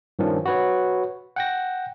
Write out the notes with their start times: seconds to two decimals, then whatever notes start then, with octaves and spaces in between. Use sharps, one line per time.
0.19 G2 D#3 F3 C#4 D4
0.46 F#4 B4 C#5
1.36 F#5 G5 A#6